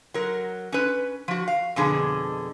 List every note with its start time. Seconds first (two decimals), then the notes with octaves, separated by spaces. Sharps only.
0.14 F#3 A#4
0.72 C#4 B4
1.28 F3 F#4
1.48 F5
1.76 F2 B2 D3 G#4